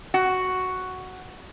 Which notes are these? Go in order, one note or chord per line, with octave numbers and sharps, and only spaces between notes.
F#4